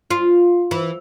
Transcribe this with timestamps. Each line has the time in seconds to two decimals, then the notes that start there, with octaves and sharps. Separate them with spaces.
0.10 F4
0.71 E3